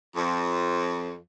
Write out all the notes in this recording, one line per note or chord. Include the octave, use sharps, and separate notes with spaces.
F2